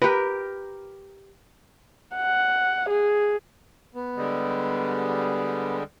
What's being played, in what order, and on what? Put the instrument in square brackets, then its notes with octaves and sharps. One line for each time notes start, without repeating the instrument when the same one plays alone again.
[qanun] G4 A#4 [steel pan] B4
[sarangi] F#5
G#4
[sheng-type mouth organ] B3
[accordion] D3 G3 G#3